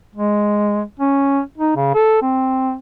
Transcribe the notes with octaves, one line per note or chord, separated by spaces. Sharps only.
G#3
C#4
D#4
C#3
A4
C4